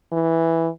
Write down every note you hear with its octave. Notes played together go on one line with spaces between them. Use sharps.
E3